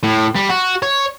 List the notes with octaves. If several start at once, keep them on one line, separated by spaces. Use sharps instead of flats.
A2
G3
F#4
C#5